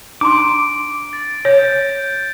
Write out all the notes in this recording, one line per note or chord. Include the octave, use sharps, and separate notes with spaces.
D4 A#5 C6 D6 D7
A6
C#5 G6